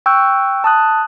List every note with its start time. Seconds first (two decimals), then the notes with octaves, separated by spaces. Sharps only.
0.06 G5 C#6 E6 F#6 G6
0.64 A5 D#6 F#6